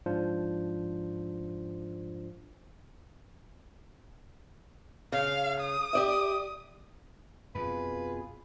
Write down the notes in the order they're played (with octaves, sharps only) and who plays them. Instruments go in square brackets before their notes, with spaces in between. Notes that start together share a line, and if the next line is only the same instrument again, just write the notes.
[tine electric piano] G#2 F3 D4 F4 C5
[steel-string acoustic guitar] C#3 [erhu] F5
[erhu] D#6
[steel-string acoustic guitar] G4 D5 E5
[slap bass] F2 [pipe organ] B2 F4 G#4 [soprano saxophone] B4